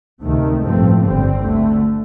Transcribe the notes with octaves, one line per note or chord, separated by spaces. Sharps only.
D2 C3 D#3 A3
A1 G2 F3 A3 C4
G1 G2 D3 G3 C4
D2 D3 A3